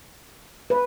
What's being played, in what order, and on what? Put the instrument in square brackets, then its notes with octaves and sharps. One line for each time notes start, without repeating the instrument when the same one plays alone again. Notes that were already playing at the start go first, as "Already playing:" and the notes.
[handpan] B4